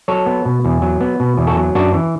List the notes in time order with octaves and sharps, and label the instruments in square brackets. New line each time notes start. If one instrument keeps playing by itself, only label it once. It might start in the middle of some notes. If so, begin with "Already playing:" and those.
[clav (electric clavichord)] F#3 A4 C#5
B3
B2
E2
F#3
B3
B2
E2
F#4 A4
F#3
F#2 D4 F#4
E3